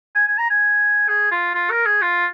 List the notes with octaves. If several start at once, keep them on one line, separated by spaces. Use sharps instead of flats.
G#5
G#5
A#5
G#5
G#4
F4
F4
A#4
G#4
F4